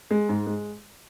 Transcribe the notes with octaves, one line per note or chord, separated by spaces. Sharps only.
G#3
G#2
G#3